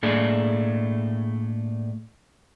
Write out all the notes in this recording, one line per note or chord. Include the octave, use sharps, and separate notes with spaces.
A2 A3 A#3 D4 G#4